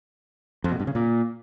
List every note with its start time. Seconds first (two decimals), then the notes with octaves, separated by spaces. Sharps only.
0.64 F2
0.72 B2
0.80 G2
0.87 C#3
0.95 A#2